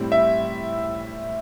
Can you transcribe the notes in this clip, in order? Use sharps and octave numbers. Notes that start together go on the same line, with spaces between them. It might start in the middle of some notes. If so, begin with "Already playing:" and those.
Already playing: A2 G3 C4 E4
E5